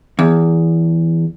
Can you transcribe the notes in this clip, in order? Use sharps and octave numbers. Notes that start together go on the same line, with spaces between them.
E2